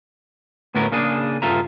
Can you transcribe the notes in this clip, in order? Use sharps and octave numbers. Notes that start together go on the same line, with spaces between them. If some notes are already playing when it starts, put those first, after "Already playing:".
D2 A2 B3 C#4 A#4
C#3 A#3 D4 G#4
G2 C#3 F4 A4 E5 A#5